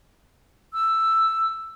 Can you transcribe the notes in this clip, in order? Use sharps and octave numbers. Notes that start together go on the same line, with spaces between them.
E6